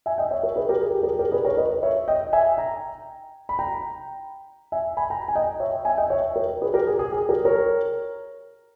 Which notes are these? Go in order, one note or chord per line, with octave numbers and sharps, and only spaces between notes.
E5 G#5
D#5 G5
C#5 E5
A#4 C#5
G#4 B4
G4 A#4
G#4
G4
A#4
G#4
G4 A#4
G#4 B4
A#4 C#5
B4 D#5
C#5 E5
D#5 G5
E5 G#5
G5 A#5
B5
G5 A#5
E5 G#5
G#5 B5
G5 A#5
G#5
D#5 G5
C#5 E5
E5 G#5
D#5 G5
C#5 E5
A#4 C#5
G#4 B4
G4 A#4
G#4
G#4
G#4
G4 A#4
A#4 C#5